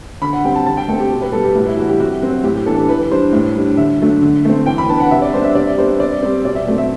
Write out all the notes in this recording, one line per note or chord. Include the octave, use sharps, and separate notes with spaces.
D3 B5
F#5
G3 C4 G5
A5
D3 A5
G5
A3 C4 A4
G4
B2
B4
G3 B3 A4
G4
A2 F#4
E4
E3 G3 F#4
G4
C3 F#4
F#3 C4 F#4
A2 G4
G4
E3 B3 D4 A4
A4
E3 B4
G3 D4 C5
A2
G3 D4
D3 E5
F#3 A3 D4
D3
A3 C4
E3 G5
B5
B3 D4 A5
F#5
C3 E5
D5
G3 B3 D4 C5
E5
C3 D5
G3 B3 D4 C5
C3 D5
G3 C4
B2 D5
E5
F#3 A3 C4
E5